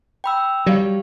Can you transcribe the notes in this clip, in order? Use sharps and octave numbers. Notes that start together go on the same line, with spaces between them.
G5 B5 E6
F#3 G3 G4 F5